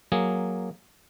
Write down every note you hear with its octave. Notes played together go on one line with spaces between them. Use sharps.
F#3 A#3 G#4